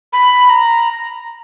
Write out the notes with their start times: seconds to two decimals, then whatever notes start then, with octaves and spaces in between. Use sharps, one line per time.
0.13 B5
0.50 A#5